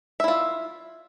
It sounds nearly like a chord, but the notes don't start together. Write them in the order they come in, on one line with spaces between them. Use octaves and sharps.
E5 E4 F4